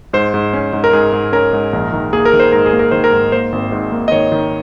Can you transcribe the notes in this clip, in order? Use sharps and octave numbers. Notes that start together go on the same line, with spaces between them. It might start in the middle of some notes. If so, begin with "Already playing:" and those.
G#2 C5
G#2
C#4
G#2
A#4
G#2 G#4
G#2
C#4 A#4
G#2
A#1
D#3
A#3 G#4
A#4
D#3
C5
G#2 A#4
G#4
A#3
A#4
D#3 C5
A#4
G#2
A#3 C5
G#1
G#2
A#3
D#5
D#3 C#5
D#3